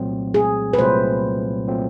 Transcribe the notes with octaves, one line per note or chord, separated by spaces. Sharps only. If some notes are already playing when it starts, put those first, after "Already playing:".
Already playing: C2 A#2 F#3 A3 C4
G#4
B4
C2 A#2 F#3 A3 C4 C5
A#2 F#3 A3 C4